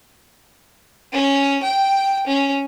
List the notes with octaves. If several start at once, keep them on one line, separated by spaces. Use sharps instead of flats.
C#4
G5
C#4